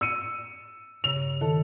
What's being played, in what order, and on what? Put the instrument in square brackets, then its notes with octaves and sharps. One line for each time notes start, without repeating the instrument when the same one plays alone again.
[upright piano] E6 C#7 D#7
[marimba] G2 C#3 [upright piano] F7
[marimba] D#3 [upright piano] A4